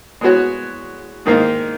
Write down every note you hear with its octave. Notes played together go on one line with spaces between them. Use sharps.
G#3 B3 F#4 C#5
G#2 D#3 A#3 D#4